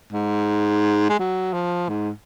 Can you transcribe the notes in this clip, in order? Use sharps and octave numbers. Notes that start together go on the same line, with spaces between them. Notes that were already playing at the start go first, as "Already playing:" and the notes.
G#2
G#3
F#3
F3
G#2